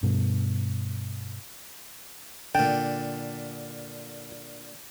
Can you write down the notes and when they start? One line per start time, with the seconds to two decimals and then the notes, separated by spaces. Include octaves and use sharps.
0.03 G2 B2
2.55 A#2 D3 G5